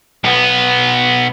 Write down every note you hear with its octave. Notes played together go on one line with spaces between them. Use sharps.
B1 B3